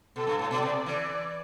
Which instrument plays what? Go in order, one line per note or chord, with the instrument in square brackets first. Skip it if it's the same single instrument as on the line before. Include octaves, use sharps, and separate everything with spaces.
[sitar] B2 [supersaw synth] A4
[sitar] G2
A2
[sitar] B2 [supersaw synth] D5
[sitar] C3
E3